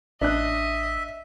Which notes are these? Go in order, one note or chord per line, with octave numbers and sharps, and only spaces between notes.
A1 D4 D#5 E5 F#6